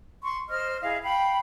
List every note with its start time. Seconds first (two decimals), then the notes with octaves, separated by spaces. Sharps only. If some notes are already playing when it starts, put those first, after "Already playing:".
0.23 C6 C#6
0.50 C5 D#5 F6
0.81 E4 G#4 D#5 F5
1.02 F5 G5 B5